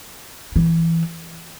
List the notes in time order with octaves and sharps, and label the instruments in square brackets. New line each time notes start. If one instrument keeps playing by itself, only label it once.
[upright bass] E3